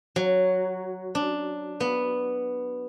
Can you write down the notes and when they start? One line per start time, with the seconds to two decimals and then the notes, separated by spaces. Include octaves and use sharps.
0.16 F#3
1.15 D4
1.80 B3